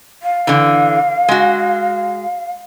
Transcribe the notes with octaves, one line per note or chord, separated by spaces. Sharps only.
F5
D3 E3
G#3 F#4